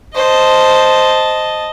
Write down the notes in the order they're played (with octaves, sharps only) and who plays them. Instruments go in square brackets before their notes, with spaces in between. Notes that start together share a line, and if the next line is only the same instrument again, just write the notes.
[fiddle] C5 [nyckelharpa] D#5 A5